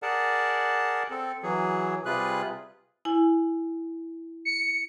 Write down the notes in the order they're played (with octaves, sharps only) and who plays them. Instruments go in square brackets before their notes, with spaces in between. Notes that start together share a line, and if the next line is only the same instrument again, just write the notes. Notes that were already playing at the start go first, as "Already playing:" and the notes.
[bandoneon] G#4 A#4 D5 F#5 A5
C4 A4
E3 F#3 G#4
C3 G3 F4 G#4 B4 F#6
[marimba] E4 G#5
[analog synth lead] C#7